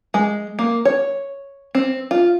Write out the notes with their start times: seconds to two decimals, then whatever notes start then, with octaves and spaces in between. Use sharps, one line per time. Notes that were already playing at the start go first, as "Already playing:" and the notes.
0.14 G#3
0.59 A#3
0.85 C#5
1.75 C4
2.11 F4